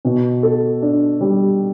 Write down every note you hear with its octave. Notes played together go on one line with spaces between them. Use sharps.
B2
A4
D4
G3